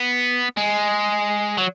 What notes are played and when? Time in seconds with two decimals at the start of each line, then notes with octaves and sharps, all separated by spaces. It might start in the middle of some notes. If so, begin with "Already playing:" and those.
Already playing: B3
0.57 G#3
1.58 F#3